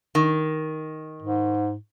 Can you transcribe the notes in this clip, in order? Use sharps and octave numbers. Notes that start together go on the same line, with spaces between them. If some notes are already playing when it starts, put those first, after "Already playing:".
D#3
G#2